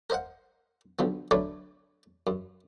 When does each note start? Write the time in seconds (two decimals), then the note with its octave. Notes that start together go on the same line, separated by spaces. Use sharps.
0.10 A#4 C5 D#5 F5 F#5
0.99 B1 D3 F3 B3
1.31 D3 F#3 A3 B4 C#5 D5
2.27 F#2